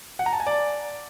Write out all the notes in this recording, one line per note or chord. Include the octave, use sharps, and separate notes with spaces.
F#5
A#5
A5
G#5
D5